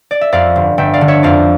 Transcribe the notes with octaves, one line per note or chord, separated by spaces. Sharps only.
D5
E5
F2 D5 F5
G1
G1 E5 G5
D5 F5
D3
C#5 E5
F2 D5 F5